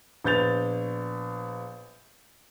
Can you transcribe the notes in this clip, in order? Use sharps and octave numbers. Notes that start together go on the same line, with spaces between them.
A#1 B3 G6 A6 F7